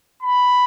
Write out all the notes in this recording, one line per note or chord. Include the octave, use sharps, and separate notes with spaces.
B5